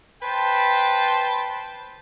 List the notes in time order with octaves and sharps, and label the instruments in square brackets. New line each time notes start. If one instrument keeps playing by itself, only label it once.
[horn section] B4 C5 G5 A5